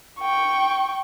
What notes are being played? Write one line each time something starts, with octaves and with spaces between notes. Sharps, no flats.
G5 C#6